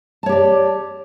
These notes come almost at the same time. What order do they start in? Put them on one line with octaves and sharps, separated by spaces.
A5 C#5 G4 D5